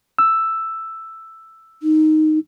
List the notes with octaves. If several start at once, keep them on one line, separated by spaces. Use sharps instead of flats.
E6
D#4